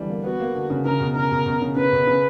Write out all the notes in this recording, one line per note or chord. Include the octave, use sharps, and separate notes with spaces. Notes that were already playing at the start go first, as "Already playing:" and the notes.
Already playing: D3 E3 G3
A#3
B3 F#4
A#3
D3
C#3
C#3 A#4
B2
C#3 A#4
B2
B2
C#3
C#3 B4
B2
C#3